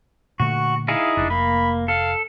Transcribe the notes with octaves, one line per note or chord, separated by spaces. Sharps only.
A#2 D3 A3 F#4 C#6
D#4 E4 G#4 F5
F1 D4
A#3 B5
A4 F5